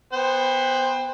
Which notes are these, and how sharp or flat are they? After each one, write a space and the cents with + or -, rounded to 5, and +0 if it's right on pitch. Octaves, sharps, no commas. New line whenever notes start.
B3 +0 C5 +0 G5 +30